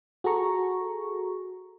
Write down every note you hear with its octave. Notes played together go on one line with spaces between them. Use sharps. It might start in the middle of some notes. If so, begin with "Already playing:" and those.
F#4 G#4 A4 A#5 C#6